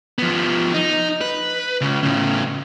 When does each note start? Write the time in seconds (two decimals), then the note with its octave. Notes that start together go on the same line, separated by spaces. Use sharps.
0.18 F3 B3
0.74 D#4
1.21 B4
1.81 C#2 C#3
2.03 A2 C#3